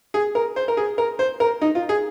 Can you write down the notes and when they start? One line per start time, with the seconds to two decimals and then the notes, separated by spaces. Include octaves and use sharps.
0.14 G#4
0.35 A#4
0.56 C5
0.68 A#4
0.77 G#4
0.98 A#4
1.19 C5
1.40 A#4
1.62 D#4
1.75 F4
1.89 G#4